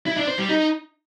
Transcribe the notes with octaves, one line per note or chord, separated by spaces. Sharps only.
E4
D4
C5
G3
D#4